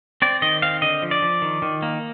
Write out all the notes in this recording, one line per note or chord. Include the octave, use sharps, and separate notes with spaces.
C4 D5
D#3 D#5
C4 F5
D3 D#5
F3
D5
F3
D#3
D#3
A#3